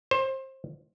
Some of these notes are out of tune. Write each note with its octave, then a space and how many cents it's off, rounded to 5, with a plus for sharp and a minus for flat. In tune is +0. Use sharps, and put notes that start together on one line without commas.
C5 +25